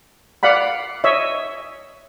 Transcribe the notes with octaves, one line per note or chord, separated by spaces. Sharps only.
D5 F5 F#5 B5
C#5 D#5 E5